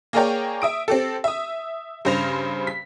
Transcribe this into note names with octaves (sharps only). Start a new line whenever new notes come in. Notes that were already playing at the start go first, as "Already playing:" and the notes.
A#3 G#4 A#4 C#5 D5 G5
E5 D#6 D7
C4 G4 A4
E5 D#6
G2 C#3 C5 A#6 F7
B6